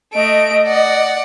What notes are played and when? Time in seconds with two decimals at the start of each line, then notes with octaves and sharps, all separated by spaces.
0.14 A3 D#5 D7
0.68 D5 F#5